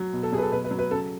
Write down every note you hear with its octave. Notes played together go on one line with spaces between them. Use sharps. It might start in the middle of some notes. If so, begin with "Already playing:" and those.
Already playing: F#3
B2
A4
F#3 G#4
B4
A4
B2 B4
B4
F#3
B4
C#3 A4